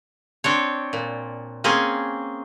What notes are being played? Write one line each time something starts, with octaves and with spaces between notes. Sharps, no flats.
C4 D4 C#5
A#2
A#3 C4 C#4 G#4